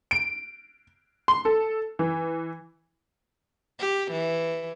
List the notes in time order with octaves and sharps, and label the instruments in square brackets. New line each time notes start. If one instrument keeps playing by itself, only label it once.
[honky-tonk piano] D7
C6
A4
E3
[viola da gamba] G4
E3